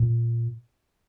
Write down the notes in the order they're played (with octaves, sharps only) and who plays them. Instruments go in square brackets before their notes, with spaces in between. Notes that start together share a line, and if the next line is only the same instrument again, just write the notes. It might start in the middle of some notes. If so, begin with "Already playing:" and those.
Already playing: [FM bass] A#2